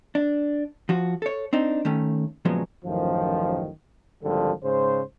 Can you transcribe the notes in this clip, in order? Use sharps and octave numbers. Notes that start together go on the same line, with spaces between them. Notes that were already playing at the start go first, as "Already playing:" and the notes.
D4
F3 F#4
A4 C#5
C4 D4 D#4
D#3 A3 C#4
A#2 C#3 F3 F#3 G#3 B3
A1 F#2 D#3 F3
G#1 D3 F3 G3 A4
G#2 C#3 C5